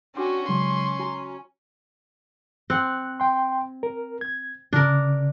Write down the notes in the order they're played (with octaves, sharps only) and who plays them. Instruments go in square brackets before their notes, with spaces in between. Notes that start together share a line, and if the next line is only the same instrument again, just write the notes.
[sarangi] C#4 [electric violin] D4 F#4 [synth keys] G5 C6 D6
[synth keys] C#3 F#3 G#3 [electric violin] C6
[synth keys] F#4 G#5 A#5
[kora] C4 F#5 [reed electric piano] F#6
[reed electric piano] G5 C6
A#4
G#6
[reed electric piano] C#3 [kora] D4 A#4